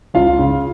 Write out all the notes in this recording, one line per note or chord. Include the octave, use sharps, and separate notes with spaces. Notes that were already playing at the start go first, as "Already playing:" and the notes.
C#2 F4 F5
C#3